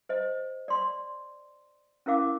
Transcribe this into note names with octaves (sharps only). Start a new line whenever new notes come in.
C5 D#5
D5 C6
C#4 E4 A#4 F5 D6